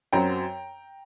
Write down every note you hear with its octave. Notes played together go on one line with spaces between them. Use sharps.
F#2 F#3 C4 G5 A#5